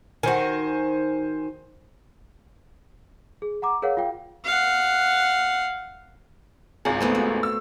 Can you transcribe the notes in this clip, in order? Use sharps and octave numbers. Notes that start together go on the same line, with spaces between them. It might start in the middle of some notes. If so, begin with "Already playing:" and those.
D#3 F#4 C5 G#5
G#4
F#5 A#5 D6
G#4 A#4 C#5 F5 F#5
F4 F5 G5
F5 F#5
G#1 C#2 G#4 F#5
A3 B3 C5
F#4
E6